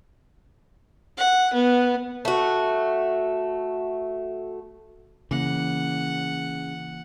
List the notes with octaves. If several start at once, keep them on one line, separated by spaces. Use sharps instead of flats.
F#5
B3
A3 F#4
C#3 E3 A#3 F#5